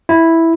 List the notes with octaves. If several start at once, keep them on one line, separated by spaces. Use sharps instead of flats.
E4